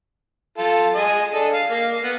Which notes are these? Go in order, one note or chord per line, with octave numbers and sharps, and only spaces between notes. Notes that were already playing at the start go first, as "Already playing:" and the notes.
F4 A4
G#4 D#5 G#5
D4 A4
F5
A#3 F5
B3